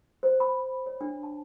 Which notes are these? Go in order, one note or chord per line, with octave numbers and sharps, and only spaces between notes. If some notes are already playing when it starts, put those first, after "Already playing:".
C5
B5
C#5
D4
A5